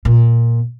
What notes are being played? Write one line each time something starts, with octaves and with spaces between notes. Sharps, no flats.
A#2